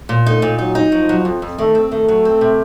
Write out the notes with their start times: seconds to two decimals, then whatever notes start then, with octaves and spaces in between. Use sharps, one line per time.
0.09 A#2
0.26 A3 D#4
0.42 A#2
0.58 F#3 D#4
0.75 D#4
0.92 F3 F#3
1.09 F#3
1.25 F2
1.42 F2
1.58 D#3 A3
1.75 C4
1.92 D#3 A3
2.08 F#3
2.25 C4
2.41 C3